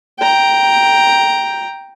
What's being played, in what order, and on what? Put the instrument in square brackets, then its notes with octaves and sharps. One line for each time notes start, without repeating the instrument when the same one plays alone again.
[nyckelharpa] G5 A#5